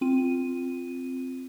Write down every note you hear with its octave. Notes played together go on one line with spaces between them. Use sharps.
C4 F4 D#7